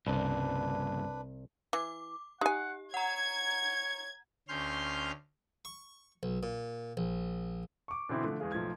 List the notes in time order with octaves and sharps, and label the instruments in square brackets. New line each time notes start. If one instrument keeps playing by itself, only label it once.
[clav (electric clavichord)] C2 [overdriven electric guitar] G2 C#3 [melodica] D4 B4
[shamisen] E3 [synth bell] D6
[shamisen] D#4 G#5 [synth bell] G4 [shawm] F#5
[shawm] C#5 [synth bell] F#5 A#5 [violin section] G#6
[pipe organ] D2 C#4 C6 F6 G6
[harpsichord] C#6
B1
A#2
A#1
[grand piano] C#6 D6
B2 D3 E3 C4 E4
D3 F3 A3
E2 G#3 G#4 F5
B1 F3 A3 G#6